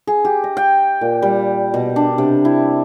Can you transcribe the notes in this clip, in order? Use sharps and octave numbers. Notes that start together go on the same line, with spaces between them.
G#4
G4
D#5
G5
A#2
G3
B2
D4
C3
E4